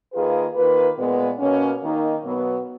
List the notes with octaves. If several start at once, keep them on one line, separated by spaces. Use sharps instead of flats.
D#3 A#3 F4 G#4 B4
D#3 A#3 F4 B4
A#2 G#3 B3
B2 A#3 C#4
D#3 A#3 D#4
B2 F#3 B3